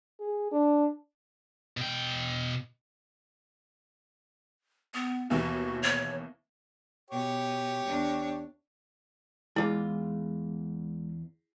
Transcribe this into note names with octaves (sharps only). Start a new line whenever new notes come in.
G#4
D4
B2 G5
B3
D#2 B2 E3 F#4
C#5
B2 G4 C#5
E2 D4
E2 G#3 E4 F4 G#4